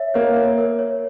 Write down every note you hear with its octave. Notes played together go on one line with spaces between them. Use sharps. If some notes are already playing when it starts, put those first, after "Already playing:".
Already playing: C#5 E5
A#3 C#5
C#5
A#4
C#5